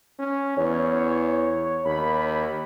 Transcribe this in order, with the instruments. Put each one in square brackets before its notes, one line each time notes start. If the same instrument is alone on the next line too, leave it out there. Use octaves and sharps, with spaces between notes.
[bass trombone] C#4
[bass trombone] E2 [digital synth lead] C#5
[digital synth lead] C#5
[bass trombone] D#2 [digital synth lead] B5